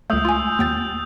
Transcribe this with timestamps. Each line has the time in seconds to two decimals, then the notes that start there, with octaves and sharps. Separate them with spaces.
0.10 C#2 A3 D#6 E6 G6
0.25 F4 G#5
0.59 D#2 G5 G6 A6